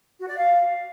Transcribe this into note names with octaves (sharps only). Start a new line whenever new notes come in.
F#4
D5
F5